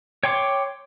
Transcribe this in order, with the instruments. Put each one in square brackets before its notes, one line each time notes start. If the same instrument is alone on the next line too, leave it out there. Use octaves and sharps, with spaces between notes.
[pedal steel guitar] C#5 G5 C6 D6